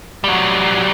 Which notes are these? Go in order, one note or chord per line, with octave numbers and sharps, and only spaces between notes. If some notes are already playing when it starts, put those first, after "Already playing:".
F#3 G3